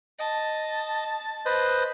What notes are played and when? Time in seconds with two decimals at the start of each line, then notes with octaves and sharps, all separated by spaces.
0.20 D#5 A5
1.45 B4 C5 D#5